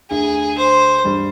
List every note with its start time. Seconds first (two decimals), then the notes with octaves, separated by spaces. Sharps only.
0.10 D2 D3 G#4
0.57 C5
1.04 G2 G3